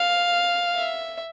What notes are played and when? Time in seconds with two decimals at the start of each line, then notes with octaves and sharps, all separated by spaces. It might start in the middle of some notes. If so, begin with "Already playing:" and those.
Already playing: F5
0.76 E5